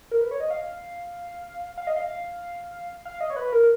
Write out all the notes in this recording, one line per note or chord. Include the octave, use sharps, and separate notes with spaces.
A#4
B4
C#5
D#5
F5
F5
D#5
F5
F5
D#5
C#5
B4
A#4